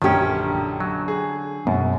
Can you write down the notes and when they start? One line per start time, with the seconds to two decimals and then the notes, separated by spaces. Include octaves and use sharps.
0.02 A#1 F#2 D3 D#3 C#4 G4
0.80 F#3
1.08 G#4
1.67 F#2 B2